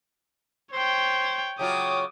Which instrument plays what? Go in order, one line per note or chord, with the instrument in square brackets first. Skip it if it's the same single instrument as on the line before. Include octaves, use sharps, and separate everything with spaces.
[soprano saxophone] C5 [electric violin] C#5 G5
[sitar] C#3 F#3 F4 [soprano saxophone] G5 [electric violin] D6 D#6